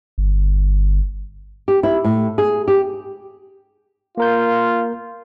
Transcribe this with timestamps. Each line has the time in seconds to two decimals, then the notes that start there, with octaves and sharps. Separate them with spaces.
0.18 G1
1.68 G4
1.83 E4
2.04 A2
2.38 G#4
2.68 G4
4.18 A#3 F4 A#4 G6